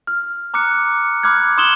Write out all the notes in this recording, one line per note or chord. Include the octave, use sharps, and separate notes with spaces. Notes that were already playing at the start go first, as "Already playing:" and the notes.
F6
A#5 D6 F6 F#6 C#7
B5 D6 F6 F#6 G#6
C6 D#6 G#6 E7 F#7 G7